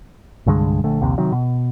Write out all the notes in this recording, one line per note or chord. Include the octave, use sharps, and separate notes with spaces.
C2 G2 D3 G#3
A#1 D3 A3
A#1 D#2 C3
C3 D#3 F#3
B2